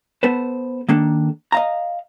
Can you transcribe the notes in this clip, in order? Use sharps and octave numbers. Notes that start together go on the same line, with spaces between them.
B3 A4 B4 C5
D#3 A#3 D4 A4
D#5 F5 A#5